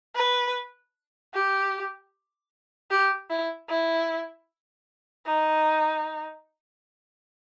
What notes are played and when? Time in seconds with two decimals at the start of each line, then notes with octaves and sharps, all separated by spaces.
0.16 B4
1.34 G4
2.91 G4
3.30 E4
3.69 E4
5.27 D#4